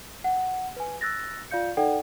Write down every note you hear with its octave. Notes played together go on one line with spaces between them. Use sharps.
F#5
B4 G#5
E6 F#6 A6 A#6
F4 D5 F5 G6 C#7
D#4 A4 D5 F#5 G5